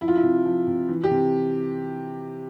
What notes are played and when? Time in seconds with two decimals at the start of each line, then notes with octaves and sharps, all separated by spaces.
0.01 F3 E4
0.08 F4
0.15 E4
0.23 C3
0.45 F3
0.67 C3
0.89 E3
1.04 G4
1.11 C3